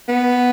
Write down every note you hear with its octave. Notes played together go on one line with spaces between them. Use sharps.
B3